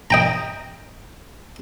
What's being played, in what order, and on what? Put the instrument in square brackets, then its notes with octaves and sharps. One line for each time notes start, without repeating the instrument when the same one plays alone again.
[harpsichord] D#5 G5 A#5